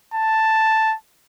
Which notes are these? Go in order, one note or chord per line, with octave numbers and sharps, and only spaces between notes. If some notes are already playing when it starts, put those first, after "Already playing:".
A5